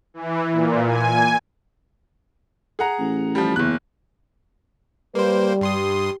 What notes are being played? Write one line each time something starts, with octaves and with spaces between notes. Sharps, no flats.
E3
A#2
G#5
G#4 F#5 A#5
A1
F3 G3
F#1 E2 F#6
G3 A#3 B4 C5
G2 G4 C6 D#6